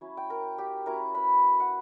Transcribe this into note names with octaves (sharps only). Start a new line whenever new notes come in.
F#3 C#4 E4
G5
A#4 A#5
G4 G5
F#3 C#4 E4 A#4 A#5
B4 B5
F#5